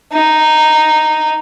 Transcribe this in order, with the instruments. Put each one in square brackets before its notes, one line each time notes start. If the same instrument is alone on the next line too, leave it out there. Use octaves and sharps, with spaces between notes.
[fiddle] D#4